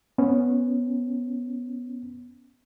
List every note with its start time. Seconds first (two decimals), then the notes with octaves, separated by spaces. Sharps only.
0.18 B3 C#4